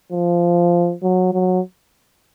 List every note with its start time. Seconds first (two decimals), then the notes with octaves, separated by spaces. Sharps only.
0.12 F3
1.03 F#3
1.33 F#3